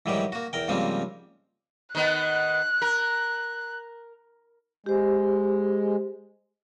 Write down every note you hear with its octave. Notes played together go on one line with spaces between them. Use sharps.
G#2 D#3 E3 F#3 G3 G4
A#3 F#4
E2 A#4 G5
G#2 C#3 F3 G3 A#3 C4
D#3 B3 F#6
A#4
G#3 G4 C5